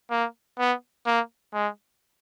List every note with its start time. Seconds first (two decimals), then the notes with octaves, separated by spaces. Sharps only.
0.10 A#3
0.59 B3
1.06 A#3
1.54 G#3